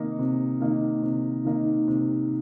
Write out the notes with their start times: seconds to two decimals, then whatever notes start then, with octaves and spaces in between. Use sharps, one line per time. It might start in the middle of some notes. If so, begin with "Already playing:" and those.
Already playing: C3 D#3 A#3 D#4
0.19 C3
0.61 D#3 A#3 D#4
1.02 C3
1.45 D#3 A#3 D#4
1.88 C3